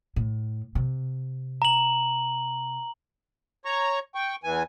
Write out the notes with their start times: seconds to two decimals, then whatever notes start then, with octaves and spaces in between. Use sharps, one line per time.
0.16 A2
0.75 C3
1.62 A#5 F#7
3.65 C#5 A#5 C#6
4.15 G5 C#6
4.44 E2 E3 G#5